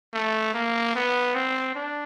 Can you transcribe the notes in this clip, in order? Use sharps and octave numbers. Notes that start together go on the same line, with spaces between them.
A3
A#3
B3
C4
D4